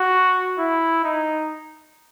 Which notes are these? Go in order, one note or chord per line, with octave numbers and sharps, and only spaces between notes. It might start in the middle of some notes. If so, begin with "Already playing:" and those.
Already playing: F#4
E4
D#4